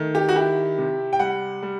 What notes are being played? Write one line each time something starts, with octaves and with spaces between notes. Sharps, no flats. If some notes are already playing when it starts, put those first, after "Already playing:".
Already playing: D#3 A3
G4
F#4
E4 G4
C3
G5
G3 F#5
G3